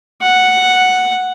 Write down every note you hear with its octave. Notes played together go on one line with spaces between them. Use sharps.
F#5